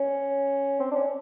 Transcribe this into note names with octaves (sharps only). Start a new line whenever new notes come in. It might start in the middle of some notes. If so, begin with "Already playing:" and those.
Already playing: C#4
C4
D4
C#4